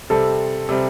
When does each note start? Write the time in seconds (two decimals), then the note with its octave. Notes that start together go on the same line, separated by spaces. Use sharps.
0.10 C3 G3 C4 A4
0.69 C3 G3 C4